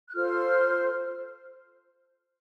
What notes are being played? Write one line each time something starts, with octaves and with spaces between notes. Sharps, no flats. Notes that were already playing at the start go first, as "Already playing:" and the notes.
F#6
F4 A4 C5 F6